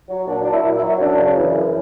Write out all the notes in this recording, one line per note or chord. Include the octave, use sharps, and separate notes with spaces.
F#3
A#2 D4
F#3 D4
E4
A#2
E4
F#3
F#2 D4
C#3
E3
F#2